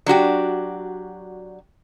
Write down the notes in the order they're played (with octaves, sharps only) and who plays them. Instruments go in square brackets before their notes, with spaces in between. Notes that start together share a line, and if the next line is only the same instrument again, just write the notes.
[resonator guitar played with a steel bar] F#3 D4 F#4 G4